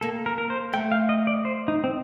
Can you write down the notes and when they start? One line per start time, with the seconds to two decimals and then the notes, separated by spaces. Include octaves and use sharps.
0.01 A#3 A4
0.26 A#4
0.38 A#4
0.50 C5
0.73 A3 G5
0.92 F5
1.09 D#5
1.27 D5
1.45 C5
1.68 D#4
1.84 C4